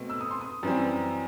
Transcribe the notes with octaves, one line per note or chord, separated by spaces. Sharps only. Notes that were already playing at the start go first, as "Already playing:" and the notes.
Already playing: B2 A3 C4
E6
D#6
C6
D#6
F#2 E3 G3 C4